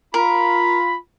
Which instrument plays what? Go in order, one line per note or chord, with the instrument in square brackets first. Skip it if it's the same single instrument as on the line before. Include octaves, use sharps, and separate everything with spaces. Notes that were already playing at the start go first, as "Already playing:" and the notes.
[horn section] F4 B5 [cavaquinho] A#4